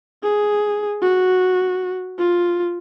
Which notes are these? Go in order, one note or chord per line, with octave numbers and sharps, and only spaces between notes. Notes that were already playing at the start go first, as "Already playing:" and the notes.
G#4
F#4
F4